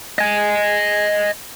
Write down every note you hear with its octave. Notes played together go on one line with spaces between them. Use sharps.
D#5 G#5